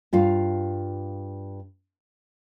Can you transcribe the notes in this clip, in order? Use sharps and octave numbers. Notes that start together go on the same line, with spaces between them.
G2 F4 F5